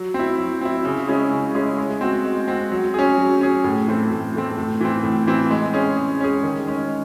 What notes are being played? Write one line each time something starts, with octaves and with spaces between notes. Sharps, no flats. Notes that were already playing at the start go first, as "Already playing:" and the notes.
Already playing: F#3
C4 E4
F#3
C4 E4
C#3
G#3 C#4 E4 G#4
C#3
G#3 C#4 E4 G#4
G#3
C4 F#4
G#3
C4 F#4
F#3
C#4 G#4
F#3
C#4 G#4
A2
E3 A3 C4
A2
E3 A3 C4
A2
E3 C4
A2
E3 C4
G#3
C#4 G#4
G#3
C#4 G#4
D#3
G#3 C#4